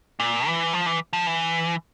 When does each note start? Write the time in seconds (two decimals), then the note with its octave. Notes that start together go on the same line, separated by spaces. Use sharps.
0.20 A#2
0.47 E3
0.73 F3
0.86 E3
1.13 F3
1.27 E3